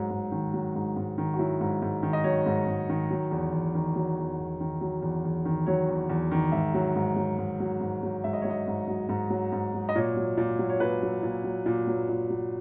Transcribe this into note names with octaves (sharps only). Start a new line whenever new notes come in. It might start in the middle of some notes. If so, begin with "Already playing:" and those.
Already playing: G#2 F#3
G#2
D#3
F#3
G#2
G#2
D#3
F#4
F#3 E4
G#2
G#2
D#3
D#5
F#3 C#5
G#2
G#2
D#3
F#3
E2
E2
D#3
F#3
E2
E2
D#3
F#3
E2
E2
D#3
F#3 C#5
E2
E2
D#3
G#2 E5
F#3
G#2
F#3
G#2
F#3
G#2
F#3
G#2 E5
D#5
F#3 C#5
D#5
G#2
F#3
G#2
F#3
G#2
F#3
D#5
A#2 C#5
F#3
A#2
F#3
C#5
A#2 B4
F#3
A#2
F#3
A#2
F#3
A#2
F#3